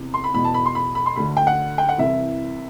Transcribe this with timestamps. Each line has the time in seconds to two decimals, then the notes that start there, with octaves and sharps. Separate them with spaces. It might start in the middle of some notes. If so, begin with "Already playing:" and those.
Already playing: E2 C3 E3
0.14 C6
0.24 B5
0.34 E2 B2 B5
0.45 A5
0.54 B5
0.66 C6
0.75 B5
0.95 B5
1.06 C6
1.16 D2 D3 B5
1.37 G5
1.47 F#5
1.78 G5
1.89 F#5
1.98 C2 C3 E3 E5